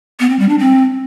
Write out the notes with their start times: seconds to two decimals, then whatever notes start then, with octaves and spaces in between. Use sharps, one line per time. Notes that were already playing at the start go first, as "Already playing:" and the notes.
0.20 B3
0.30 C4
0.39 G3
0.49 D4
0.59 C4